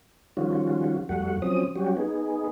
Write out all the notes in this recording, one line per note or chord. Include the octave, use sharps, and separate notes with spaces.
D#3 F3 G3 C#4 F4 F#4
F2 G3 A3 F#4 F#5
F3 F#3 C4 C#4 D#6
F#3 G3 C#4 F#4 G4
B3 D#4 G#4